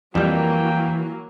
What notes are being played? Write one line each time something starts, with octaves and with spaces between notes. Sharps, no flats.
F2 E3 F#3 G3 A#3 G5